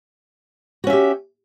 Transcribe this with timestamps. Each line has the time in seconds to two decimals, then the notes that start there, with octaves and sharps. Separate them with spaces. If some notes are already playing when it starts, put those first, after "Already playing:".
0.84 F#4
0.87 C#4
0.90 E5
0.93 G4